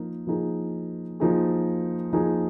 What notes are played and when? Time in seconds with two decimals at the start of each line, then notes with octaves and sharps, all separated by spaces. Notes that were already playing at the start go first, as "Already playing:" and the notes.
Already playing: F3 A#3 D#4
0.27 F3 A#3 D#4 G#4
1.20 F3 A#3 D#4 G#4
2.13 F3 A#3 D#4 G#4